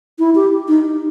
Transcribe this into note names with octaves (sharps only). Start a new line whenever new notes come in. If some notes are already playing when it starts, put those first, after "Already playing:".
E4
G4
D#4